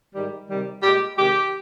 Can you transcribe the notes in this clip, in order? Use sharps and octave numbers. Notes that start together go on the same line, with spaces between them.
G#2 D#3 G3
C3 D#3 G3
A#2 G#3 G4
C3 D#3 G#3 G4